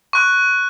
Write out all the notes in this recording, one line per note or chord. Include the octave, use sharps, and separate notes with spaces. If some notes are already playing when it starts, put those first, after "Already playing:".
C#6 F#6